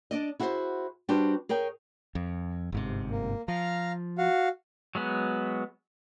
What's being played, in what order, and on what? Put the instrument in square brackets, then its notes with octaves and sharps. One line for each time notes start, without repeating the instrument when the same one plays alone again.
[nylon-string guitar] D4 D5 D#5
E4 F#4 G#4 B4 C5
G3 D4 F#4 G4 B4 C5
G#4 A#4 C#5 G5
[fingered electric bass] F2
G1 G#2 C3
[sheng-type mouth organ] A#3
[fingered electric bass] F3 [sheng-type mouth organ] F5 A#5 F6
[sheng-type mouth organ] F#4 F5
[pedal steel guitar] F#3 G#3 B3